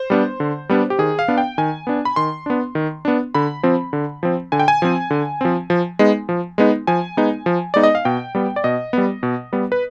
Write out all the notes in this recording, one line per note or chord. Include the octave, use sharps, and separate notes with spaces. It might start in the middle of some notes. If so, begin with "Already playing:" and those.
Already playing: C5
G3 B3 D4
D3
G3 B3 D4
G4
D#3 G#4
F5
B3 D4
G5
D#3 G#5
B3 D4
B5
D#3 C6
B3 D4
D#3
B3 D4
D3 B5
F3 C4
D3
F3 C4
D3 G#5
G5
G#5
F3 C4
D3
F3 C4
F3
G#3 B3 D#4
F3
G#3 B3 D#4
F3 G#5
G#3 B3 D#4
F3
G#3 B3 D#4 D5
D#5
F5
B2 G5
G3 B3
D5
B2 D#5
G3 B3
B2
G3 B3
B4